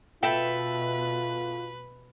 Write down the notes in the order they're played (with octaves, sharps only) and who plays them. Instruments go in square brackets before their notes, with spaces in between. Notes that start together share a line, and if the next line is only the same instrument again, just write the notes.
[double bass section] B2 [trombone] F4 [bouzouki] A4 E5 G5 [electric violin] B4